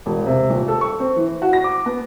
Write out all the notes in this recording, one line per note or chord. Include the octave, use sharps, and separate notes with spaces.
E1
C3
D#1
A4
C#6
C4
E3
F#4
A#6
D6
B3